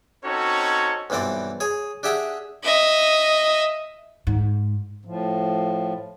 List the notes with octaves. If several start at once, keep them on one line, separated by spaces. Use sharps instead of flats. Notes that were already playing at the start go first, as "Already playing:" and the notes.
C4 C#4 D#4 F#4 A4 C#5
B1 G2 E3 C4 D5
G#4 C#5 G#5
D4 G4 G#4 E5 F#5 G5
D#5 E5
G#2
A2 F3